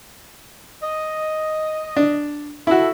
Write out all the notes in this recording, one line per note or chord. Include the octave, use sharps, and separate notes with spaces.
D#5
D4
E4 F#4 A4 E5